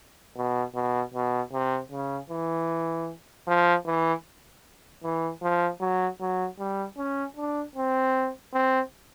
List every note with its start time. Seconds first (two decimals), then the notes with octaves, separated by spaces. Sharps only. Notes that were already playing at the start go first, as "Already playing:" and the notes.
0.36 B2
0.75 B2
1.14 B2
1.52 C3
1.92 C#3
2.30 E3
3.47 F3
3.86 E3
5.03 E3
5.42 F3
5.80 F#3
6.20 F#3
6.59 G3
6.97 C#4
7.36 D4
7.75 C4
8.53 C4